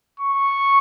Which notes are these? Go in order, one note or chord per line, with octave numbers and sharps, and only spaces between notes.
C#6